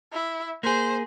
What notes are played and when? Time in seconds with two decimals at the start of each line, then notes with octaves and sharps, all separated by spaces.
0.13 E4
0.63 A#3 G#4 C5